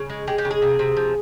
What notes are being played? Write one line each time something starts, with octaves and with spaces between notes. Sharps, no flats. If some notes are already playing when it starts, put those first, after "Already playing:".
Already playing: C#3
G#3
G#3 G4
G4
C#3
G#4
C3
C3
F3